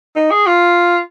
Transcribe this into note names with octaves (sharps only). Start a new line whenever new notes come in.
D#4
G#4
F4